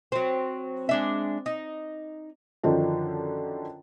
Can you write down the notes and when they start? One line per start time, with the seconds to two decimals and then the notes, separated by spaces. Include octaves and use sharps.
0.12 F#3 C4
0.89 G#3 D4 E5
1.46 D#4
2.63 F#2 D3 D#3 F3 D4